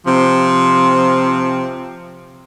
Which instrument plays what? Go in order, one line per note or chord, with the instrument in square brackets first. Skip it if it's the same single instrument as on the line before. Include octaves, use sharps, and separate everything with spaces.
[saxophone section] C3 F3 C4